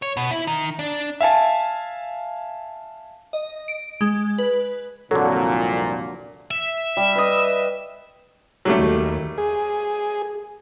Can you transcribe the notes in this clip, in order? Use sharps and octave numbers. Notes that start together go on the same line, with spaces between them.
C#5
B2
E4
D#3
D4
E5 F5 G#5 A5
D#5
D7
G#3
B4
C2 F2 A#2 D3 F#3 A4
E5
G3
B4 D#5
F#3 G3 A3
D#2
G#4